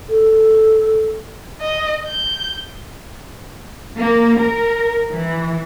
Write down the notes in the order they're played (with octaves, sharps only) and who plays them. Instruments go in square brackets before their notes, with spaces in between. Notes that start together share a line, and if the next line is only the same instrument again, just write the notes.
[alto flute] A4
[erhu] D#5
G6
[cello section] A#3
A#4
E3